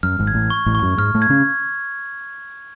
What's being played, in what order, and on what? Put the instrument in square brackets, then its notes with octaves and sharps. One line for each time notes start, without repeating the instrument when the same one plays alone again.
[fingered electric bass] F#2 [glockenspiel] F6
[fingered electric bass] G#1 G#2
[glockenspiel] G#6
[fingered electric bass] A1 A2
[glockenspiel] C#6
[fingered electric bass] A1 A2
[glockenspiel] C#6
[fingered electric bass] F#2 F#3
[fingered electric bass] G#2 G#3 [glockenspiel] F6
[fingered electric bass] A2 A3
[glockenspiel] G#6
[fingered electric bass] C#3 C#4